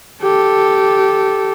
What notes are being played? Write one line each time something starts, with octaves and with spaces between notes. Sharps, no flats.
G4 A4